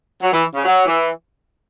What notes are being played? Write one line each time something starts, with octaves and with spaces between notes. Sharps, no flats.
F#3
E3
C#3
F#3
E3